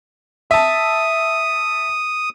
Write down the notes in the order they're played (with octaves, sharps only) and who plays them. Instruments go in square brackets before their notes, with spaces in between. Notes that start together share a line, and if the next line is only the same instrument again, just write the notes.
[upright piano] E5 A5 [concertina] D#6